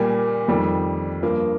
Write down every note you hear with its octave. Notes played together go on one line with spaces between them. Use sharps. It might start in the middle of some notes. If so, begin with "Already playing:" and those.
Already playing: A#2 G3 A#3 G#5
F2 D#3 G3
G2 F3 A#3